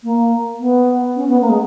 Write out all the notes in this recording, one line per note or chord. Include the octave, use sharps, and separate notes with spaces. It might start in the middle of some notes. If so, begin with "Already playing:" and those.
A#3
B3
C#4
B3
A#3
G#3